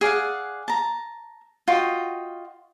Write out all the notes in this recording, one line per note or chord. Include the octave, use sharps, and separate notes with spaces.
G#4 D5 F5 F#5
A5 A#5
F4 F#4 D#5 G5